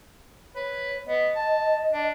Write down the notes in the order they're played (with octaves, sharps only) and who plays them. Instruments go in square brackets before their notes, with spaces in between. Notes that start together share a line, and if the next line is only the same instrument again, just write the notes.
[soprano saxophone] B4 [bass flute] C#5
[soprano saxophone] B3 [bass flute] D#5
[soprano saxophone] A5
D4